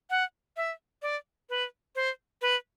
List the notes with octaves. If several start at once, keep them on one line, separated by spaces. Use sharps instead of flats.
F#5
E5
D5
B4
C5
B4